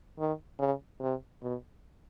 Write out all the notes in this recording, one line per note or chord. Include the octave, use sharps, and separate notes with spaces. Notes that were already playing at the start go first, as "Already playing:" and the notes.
D#3
C#3
C3
B2